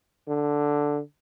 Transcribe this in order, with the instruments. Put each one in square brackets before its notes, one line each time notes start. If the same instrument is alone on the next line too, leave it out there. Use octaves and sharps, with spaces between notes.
[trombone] D3